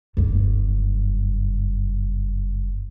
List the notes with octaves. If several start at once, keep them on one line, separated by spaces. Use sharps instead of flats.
F#1 G2